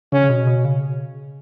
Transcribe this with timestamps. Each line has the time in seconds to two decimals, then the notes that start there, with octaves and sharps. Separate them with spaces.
0.12 C#3 C#4
0.24 C#3
0.29 B2
0.47 B2
0.65 C#3